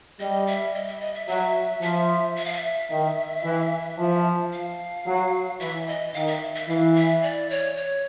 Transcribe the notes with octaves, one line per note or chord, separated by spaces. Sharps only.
G3 D#5
E5
D#5
E5
D#5
E5
F#3 E5
F3 E5
E5
F5
E5
D#3
E3
F3
F5
F#3
E3 E5
D#5
D#3 F5
E5
E5
E3 F5
E5
D5
C#5
C#5